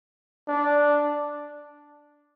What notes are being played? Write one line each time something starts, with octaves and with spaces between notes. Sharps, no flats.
D4